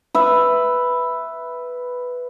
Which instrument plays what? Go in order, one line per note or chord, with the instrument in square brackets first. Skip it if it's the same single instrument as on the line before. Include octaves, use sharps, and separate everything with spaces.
[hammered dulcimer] B4 E5